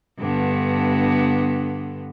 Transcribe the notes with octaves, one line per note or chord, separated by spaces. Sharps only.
G2 D3 B3